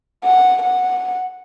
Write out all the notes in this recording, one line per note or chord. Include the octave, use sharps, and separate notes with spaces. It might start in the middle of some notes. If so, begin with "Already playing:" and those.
F#5
F#5